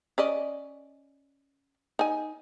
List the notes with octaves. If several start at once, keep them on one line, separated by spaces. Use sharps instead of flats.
C#4 D5 D#5
D#4 G#5